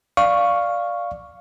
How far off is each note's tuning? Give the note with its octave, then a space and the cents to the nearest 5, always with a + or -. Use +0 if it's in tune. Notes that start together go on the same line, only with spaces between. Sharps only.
D5 +0 F5 +0 C#6 +0